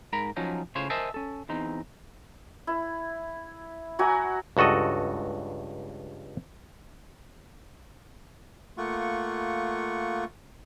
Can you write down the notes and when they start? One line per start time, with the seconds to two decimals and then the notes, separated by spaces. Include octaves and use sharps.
0.13 G#2 A#4 A#5 B5
0.37 F3 F#3 C#4 D#4
0.75 A2 C#3 F4 C5 C#5
0.90 A#4 C5 D#5 E5 G#5 A5
1.14 C#4 A4
1.49 E2 C4 D#4
2.67 E4
3.99 F#3 F#4 G#5
4.57 C#2 G2 F#4 A4 D#5
8.78 A3 A#3 F4 F#5 C#6